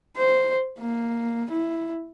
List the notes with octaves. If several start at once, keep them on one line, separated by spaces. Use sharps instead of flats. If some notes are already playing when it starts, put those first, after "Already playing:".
C5
A#3
E4